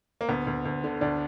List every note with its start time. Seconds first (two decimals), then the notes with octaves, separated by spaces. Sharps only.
0.21 A#3
0.29 D2 B3
0.47 D2
0.65 D2
0.84 D3
1.01 D2 D4